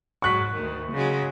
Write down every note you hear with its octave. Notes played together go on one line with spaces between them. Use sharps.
G#2 F#3 C#6 F#6 B6
D2 D#3
C#3 F#3 G#3